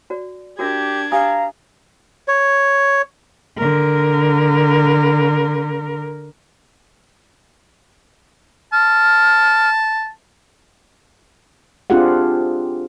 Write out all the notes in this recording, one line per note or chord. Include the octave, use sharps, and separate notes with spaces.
F#4 D5
D4 F#4 G4 A#4 E5 G#6
G4 F5 G#5 A#5 D#6
C#5
D3 A#4
A5 F6
C4 D4 F4 G4 G#4 F#5